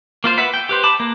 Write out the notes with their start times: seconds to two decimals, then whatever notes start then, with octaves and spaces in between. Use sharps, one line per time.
0.24 A#3 F4 C5
0.38 B4 E5 F#5 B5
0.54 G5
0.69 G4 B4 C5
0.84 A5 B5 D6
1.00 A#3